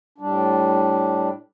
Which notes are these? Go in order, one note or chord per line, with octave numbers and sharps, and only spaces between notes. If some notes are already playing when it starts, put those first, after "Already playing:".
A2 G3 D4